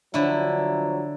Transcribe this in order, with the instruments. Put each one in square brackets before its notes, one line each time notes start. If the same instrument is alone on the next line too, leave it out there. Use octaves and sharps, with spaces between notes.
[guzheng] D3 E4 [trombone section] F3 F#3